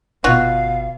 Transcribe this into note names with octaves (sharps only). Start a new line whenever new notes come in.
G1 B2 F4 F#4 F5